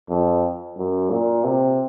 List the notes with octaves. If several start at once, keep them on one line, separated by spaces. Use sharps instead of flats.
F2
F#2
A#2
C3